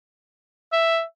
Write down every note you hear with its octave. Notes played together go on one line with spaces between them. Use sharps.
E5